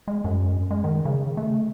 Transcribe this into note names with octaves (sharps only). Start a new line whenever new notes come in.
G#3
F#2
G#3
D#3
C#3
A3